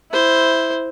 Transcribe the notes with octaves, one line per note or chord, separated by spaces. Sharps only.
E4 C5